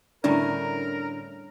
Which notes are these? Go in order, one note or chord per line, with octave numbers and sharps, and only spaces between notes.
A2 D3 G3 A3 C#4 A#4 D5 A#5